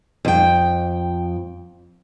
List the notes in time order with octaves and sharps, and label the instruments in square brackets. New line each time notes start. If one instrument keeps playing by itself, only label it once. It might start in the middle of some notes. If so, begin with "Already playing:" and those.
[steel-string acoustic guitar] F2 G5